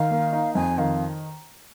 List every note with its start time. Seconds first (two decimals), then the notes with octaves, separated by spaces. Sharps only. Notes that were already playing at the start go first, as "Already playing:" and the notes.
Already playing: D#3 F5
0.11 A#3
0.33 D#4
0.55 F2 G#5
0.78 D#3 F5